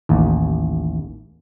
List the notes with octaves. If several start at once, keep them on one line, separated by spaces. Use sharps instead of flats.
A1 D#2